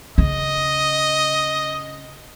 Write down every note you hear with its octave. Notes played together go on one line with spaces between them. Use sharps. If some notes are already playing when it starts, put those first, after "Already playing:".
C#3 D#5